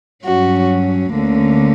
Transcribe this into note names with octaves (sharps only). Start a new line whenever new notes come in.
G2 F#3 C#4 F#4
D2 D3 A#3 C#4